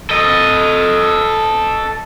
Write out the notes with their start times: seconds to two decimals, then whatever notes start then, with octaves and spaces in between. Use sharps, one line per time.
0.10 A4 D#5